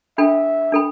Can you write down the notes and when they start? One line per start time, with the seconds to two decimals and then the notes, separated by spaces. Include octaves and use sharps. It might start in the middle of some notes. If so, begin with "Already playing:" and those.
0.18 D4 A4 E5 G5 B5
0.72 D4 A4 G5 B5